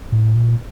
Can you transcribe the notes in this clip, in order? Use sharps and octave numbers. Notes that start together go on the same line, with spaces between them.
A2
A#2